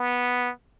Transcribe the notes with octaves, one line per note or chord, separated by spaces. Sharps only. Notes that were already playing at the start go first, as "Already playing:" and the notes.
Already playing: B3